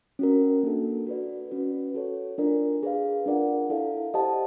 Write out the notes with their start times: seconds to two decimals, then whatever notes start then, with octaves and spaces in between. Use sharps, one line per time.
0.19 C#4 F#4 A#4
0.63 A#3 D4 F#4 A4
1.07 F#4 B4 D5
1.51 C#4 F#4 B4
1.94 F#4 A4 C#5
2.38 D4 F4 A#4 D5
2.83 G#4 B4 D5 F5
3.26 D4 F4 A#4 D5 F#5
3.70 E4 A4 D5 F5
4.14 G4 C5 D#5 F#5 A5